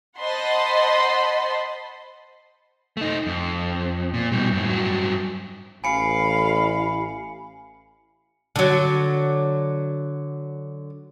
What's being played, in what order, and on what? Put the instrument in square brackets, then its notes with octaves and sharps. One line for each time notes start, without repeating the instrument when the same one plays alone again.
[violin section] C5 D#5 F#5 A5 B5 C6
[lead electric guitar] A3 D#4
F2
A#2
B2 G3
F#2 A2
G2 F#3
[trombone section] A1 [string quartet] F5 [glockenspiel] G#5 C#7 [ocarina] B5
[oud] D3 F#3